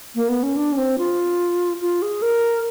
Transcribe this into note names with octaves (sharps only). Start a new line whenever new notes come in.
A#3
B3
C#4
D4
C#4
C4
F4
F4
G#4
A#4